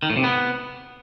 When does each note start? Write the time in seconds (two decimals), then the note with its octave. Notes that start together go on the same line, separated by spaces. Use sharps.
0.03 D#3
0.10 A2
0.17 C3
0.24 B3